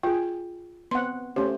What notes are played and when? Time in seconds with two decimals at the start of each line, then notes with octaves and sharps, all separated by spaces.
0.03 F4 G#4 G5
0.91 B3 C4 F#5 C6
1.36 A3 C#4 G4 C5